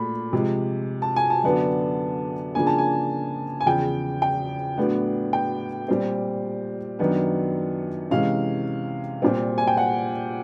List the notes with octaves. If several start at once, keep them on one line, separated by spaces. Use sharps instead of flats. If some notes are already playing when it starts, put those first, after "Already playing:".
Already playing: A#2 A3 B5
C3 F3 G#3
A5
G#5
A5
F#2 D3 F#3 B3 D4
C#3 F3 A#3 D4 G#5
A5
G#5
G#5
E2 C#3 F3 G5
G5
A2 F#3 B3 D4
G5
A#2 G3 C4
F#2 D#3 F#3 B3 D4
C3 E3 G#3 C#4 F5
A#2 G3 C4
G#5
G5
F#5